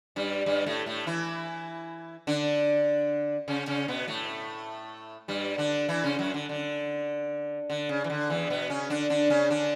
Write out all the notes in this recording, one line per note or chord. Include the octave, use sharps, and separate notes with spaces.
G2 G3
G2 G3
A2 A3
A2 A3
E3 E4
D3 D4
C#3 C#4
C#3 C#4
B2 B3
A2 A3
G2 G3
D3 D4
E3 E4
C#3 C#4
F#2 F#3
D3
D3
D3
C#3
E3
D3
E2 E3
B2 B3
C#3 C#4
D3 D4
D3 D4
C#3 C#4
D3 D4